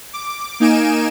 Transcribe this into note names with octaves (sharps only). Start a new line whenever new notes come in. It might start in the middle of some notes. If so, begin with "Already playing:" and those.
D6
A#3 D#4 G#5 D7 E7